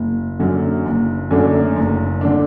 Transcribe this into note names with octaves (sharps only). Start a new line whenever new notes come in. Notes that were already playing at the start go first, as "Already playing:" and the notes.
Already playing: F#1
F#2 D3 F#3
F#1
F#2 D3 A3 D4
F#1
D3 A3 D4